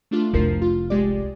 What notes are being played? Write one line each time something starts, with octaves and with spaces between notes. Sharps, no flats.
A3 D4 F4
F1 C2 F3 A#4 C7
F4
G#3 G4 D5